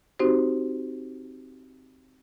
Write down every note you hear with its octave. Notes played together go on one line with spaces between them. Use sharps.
C4 D#4 F#4 G4 C5